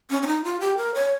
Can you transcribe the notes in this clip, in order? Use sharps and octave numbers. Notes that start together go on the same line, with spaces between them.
C#4
C#4
D#4
F4
G4
A#4
C#5